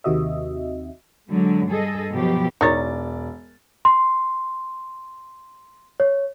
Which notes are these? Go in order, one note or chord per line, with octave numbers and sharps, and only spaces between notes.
D#2 C3 D#3 F#4 D#5 E5
D3 F#3 G#3
G2 G#4 A4 D#5
B2 F3 F#3 G4
E1 D#4 A#4 C#5 D5 A6
C6
C#5